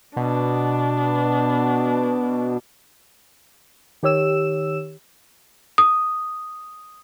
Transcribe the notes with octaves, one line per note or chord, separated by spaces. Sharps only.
B2 D4
D#3 G4 C#5 E6 E7
D#6